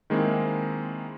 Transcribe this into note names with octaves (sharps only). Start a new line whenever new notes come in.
D#3 G#3 A#3 C4 E4